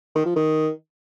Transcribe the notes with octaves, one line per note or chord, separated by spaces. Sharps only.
D#3
F3
D#3